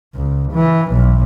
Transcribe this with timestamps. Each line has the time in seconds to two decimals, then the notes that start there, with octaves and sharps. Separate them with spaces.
0.15 C#2
0.52 E3
0.93 B1